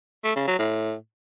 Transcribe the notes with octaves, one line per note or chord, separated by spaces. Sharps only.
A3
C#3
F#3
A2